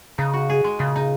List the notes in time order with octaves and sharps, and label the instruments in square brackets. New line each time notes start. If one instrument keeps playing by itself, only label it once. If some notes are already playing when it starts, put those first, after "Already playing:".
[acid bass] C#3 [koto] D#4
[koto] F#4
G#4
G#3
[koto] A#2 [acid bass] C#3
[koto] D#4